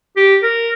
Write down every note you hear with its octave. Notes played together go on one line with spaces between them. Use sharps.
G4
A#4